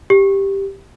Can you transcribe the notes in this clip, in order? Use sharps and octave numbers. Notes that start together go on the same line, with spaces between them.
G4